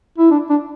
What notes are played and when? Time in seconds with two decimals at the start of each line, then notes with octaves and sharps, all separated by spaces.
0.18 E4
0.31 D4
0.50 D4